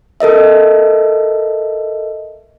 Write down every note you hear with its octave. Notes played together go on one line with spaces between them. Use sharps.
A4 A#4 D#5 E5